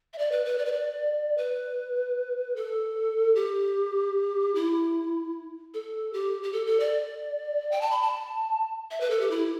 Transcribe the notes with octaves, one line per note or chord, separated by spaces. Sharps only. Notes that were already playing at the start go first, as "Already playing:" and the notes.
E5
D5
B4
B4
D5
B4
D5
B4
A4
G4
E4
A4
G4
G4
A4
A4
D5
G5
A5
B5
A5
E5
B4
A4
G4
E4